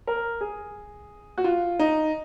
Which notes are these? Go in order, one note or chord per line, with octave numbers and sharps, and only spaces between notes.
A#4
G#4
F#4
F4
D#4